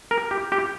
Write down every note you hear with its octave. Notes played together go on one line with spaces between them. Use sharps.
A#4
G4
G4